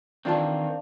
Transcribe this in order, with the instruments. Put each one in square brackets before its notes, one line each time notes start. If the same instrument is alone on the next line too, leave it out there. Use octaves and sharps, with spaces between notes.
[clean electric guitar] D#3 E3 C4 [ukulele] D4 F4 A5